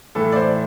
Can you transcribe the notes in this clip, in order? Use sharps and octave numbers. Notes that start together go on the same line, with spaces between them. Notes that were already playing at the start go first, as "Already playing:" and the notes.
A2 E3 A4
D5
C5